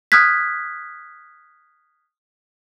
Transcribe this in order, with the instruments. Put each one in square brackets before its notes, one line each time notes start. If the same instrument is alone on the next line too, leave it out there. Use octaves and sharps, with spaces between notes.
[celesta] D#6 F6 F#6 G#6 B6